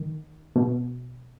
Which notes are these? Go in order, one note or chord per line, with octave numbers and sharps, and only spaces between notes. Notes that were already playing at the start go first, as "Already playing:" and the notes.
Already playing: D#3
B2